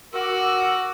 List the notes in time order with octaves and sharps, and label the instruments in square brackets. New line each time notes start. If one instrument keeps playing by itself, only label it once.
[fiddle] F#4 [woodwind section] A#4 D6 E6